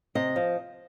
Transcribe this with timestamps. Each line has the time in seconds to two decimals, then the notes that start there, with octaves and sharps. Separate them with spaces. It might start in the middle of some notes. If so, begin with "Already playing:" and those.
0.15 C3 D#5
0.36 F3